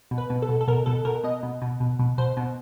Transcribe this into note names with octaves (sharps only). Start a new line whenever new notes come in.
B2
B4
B2
A4
B2
A4
B2 A#4
B2 A4
B2 A#4
B2 D#5
B2
B2
B2
B2
B2 C5
B2